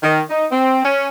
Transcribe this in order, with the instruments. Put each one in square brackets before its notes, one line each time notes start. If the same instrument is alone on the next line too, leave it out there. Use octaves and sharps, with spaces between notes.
[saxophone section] D#3
D#4
C4
C#4